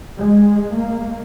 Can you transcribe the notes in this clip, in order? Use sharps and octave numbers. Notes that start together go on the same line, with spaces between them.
G#3
A#3